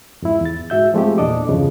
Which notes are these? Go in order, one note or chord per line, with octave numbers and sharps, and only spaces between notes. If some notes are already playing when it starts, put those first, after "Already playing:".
F2 G#2 E4
E2 A6
G#2 F#4 E5 G6
F3 G#3 A3 C4 G4
E2 A#2 D4 A4 D#5 D6
E2 G2 C#3 F3